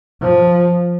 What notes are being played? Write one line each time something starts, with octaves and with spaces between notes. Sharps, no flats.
F3